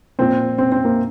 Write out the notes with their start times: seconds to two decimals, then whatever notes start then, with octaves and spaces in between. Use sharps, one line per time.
0.19 A#2 F3 C4
0.58 C4
0.72 C4
0.85 A#3